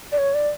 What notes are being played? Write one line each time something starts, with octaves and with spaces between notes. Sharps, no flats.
D5
C#5
D5